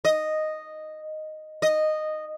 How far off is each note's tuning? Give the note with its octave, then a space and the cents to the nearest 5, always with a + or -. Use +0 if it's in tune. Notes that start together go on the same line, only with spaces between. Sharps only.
D#5 -5
D#5 -10